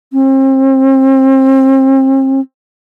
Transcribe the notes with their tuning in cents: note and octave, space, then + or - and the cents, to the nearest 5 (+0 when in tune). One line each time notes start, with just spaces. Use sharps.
C4 +35